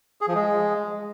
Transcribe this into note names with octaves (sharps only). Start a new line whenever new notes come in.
G#4
F3
G#3